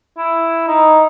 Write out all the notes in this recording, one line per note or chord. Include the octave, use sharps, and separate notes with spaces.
E4
D#4